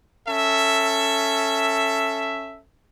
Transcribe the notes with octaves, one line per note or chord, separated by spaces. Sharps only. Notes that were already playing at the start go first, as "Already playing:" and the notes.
C#4 A4 E5